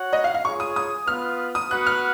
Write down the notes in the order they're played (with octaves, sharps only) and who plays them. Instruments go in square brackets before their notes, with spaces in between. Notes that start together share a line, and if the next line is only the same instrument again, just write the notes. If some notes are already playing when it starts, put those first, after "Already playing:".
Already playing: [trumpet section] F#4 C#5 F#5
[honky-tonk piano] D#5
F5
F5
[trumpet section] F4 G#4 C#5 [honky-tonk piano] C#6
[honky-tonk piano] D#6
D#6
[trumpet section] B3 F4 B4 [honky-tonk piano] F6
[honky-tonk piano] D#6
[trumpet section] B3 F#4 B4 F#5 [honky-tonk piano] F#6
[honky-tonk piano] F6